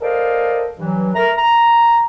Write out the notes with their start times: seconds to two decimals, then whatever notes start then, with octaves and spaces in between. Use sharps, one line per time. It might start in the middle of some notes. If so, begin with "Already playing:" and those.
0.01 A4 A#4 C5 D5 D#5 F5
0.79 G2 E3 F#3
1.15 A3 A#4 A#5
1.37 A#5